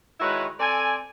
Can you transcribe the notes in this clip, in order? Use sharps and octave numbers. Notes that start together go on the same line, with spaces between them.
D#3 G#3 E4 F#4 B4 C#5
C4 A4 D5 G#5